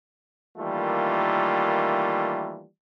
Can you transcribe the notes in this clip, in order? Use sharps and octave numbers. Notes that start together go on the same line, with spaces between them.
D#3 E3 G3 A3 A#3 F4